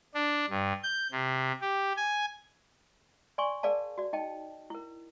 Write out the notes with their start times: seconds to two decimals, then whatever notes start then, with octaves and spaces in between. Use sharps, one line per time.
0.14 D4
0.50 G2
0.83 G6
1.12 C3
1.61 G4
1.96 G#5
3.38 D5 G#5 C6 C#6
3.63 G#4 A#4 D5 F5 A5
3.98 F#4 D5
4.13 D#4 D#5 G5 A5
4.70 E4 A#4